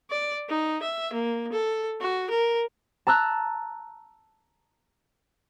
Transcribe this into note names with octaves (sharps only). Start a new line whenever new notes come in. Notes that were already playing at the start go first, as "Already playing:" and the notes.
D5
D#4
E5
A#3
A4
F#4
A#4
A5 A#5 E6 F#6